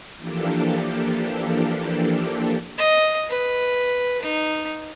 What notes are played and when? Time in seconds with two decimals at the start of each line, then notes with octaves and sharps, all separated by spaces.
0.18 E3 F3 A#3 D4 G4 A4
2.78 D#5
3.30 B4
4.23 D#4